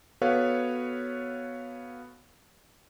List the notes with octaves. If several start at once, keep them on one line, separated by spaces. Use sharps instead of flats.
B3 F#4 A4 B4 C#5 F5